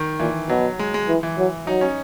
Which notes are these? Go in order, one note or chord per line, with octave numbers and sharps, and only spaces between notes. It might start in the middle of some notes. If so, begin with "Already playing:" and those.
Already playing: D#3
A#2 E3
B2 F#3
G#3
G#3
E3
E3
F#3
F#3 D#4
C#4